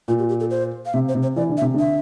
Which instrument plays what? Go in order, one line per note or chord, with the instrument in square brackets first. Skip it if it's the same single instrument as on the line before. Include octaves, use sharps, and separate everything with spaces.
[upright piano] A#2 [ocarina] F4
[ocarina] G4
G4
A4
C5
F5
[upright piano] C3 [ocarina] E5
[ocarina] C5
[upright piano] C3
[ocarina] C5
[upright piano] E3 [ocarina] D5
[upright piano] D3
[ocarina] E5
[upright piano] C3
D3
[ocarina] E5